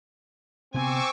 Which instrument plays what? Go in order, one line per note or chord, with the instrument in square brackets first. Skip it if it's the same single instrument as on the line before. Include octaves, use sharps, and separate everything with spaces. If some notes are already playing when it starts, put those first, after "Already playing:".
[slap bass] C3 B3 [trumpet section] C4 [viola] G#5 [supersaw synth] C#6 D6 E6